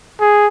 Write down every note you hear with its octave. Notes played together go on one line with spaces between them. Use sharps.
G#4